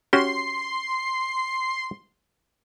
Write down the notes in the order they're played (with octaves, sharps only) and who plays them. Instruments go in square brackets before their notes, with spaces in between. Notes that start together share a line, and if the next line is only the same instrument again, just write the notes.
[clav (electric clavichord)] C#4 F#4 G4 [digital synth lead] C6